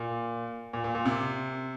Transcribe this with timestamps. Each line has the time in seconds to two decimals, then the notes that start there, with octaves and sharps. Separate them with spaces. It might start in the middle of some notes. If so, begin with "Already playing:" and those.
Already playing: A#2
0.73 A#2
0.84 A#2
0.95 A#2
1.05 C3